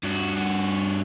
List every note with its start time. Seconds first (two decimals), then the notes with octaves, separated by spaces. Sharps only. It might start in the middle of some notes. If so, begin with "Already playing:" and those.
0.03 G2 F#4